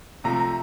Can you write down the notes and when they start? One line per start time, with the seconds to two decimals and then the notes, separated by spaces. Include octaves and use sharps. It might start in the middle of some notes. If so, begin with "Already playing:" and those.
0.24 C3 F3 A3 A#5
0.40 A#5